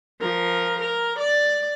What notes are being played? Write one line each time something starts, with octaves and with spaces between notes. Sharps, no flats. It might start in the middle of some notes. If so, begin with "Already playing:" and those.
F3 A#4
A#4
D5